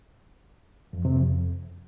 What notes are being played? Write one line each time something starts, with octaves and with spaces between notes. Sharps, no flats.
F2
C3
F2